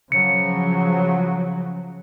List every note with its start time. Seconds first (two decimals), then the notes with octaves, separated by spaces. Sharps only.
0.12 C#3 F3 F#3 C#7